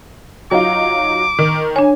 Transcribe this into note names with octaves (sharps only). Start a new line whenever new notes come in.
F#3 D#4 F4 D6
D#3
D4 C#5 G#5